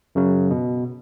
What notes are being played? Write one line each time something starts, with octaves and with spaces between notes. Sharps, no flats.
F#2 C#3 F#3
B2